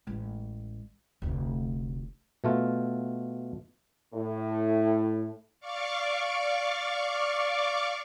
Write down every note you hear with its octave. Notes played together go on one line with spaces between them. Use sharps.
A1 G#3
F1 D2
B2 A3 F4
A2
D5 F5 C#6 D6